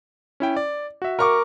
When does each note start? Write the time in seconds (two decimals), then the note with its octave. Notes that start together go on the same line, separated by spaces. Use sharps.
0.40 C#4 E4 G5
0.57 D5
1.02 F#4 E5
1.19 A#4 C#6 D6